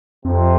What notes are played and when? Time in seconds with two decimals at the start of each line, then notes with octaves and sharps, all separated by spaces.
0.25 F2 C3